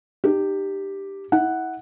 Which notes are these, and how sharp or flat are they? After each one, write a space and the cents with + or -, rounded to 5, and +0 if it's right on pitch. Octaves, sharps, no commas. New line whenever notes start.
D#4 -40 G4 +0
E4 -30 F#5 +0